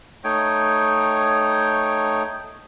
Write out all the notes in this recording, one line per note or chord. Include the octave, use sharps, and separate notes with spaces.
A3 D#4 C#5 G5